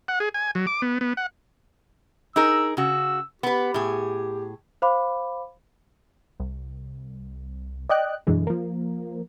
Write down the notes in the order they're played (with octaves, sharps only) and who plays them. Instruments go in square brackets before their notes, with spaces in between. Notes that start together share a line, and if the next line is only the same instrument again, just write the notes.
[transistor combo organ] F#5
G#4
G#5
F#3
D6
B3
B3
F#5
[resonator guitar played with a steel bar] D#4 G#4 A#4 [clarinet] E6
[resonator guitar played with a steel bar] C#3 F#4 [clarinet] E6
[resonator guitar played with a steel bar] B3 B4 [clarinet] G4
[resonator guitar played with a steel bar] A2 G#4
[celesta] C5 F5 B5 D6
[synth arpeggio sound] C2
D5 D#5 G5 F#6
F#2 B2 D3 E3 G#3
F3 A#3